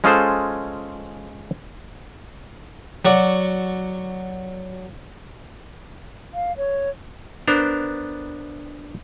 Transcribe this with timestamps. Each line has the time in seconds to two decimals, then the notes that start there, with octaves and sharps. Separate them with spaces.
0.04 G#3 C#4 F4 G#4 A4 C5
3.05 F#3 F#4 D5
6.34 F5
6.57 C#5
7.47 B3 D4 A#4 C5 A#5